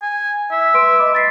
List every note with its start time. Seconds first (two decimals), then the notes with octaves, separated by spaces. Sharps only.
0.02 G#5
0.51 E5
0.74 B4 C6 D7
0.99 D#5 B5 D6
1.15 A6 B6 C7